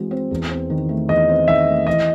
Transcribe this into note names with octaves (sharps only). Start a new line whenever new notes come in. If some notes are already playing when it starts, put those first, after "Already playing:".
Already playing: E3 G#3 C4 F#4
C4
E2
C4
D#3
A3
E2 D#5
C4
D#3 E5
A3
E3 D#5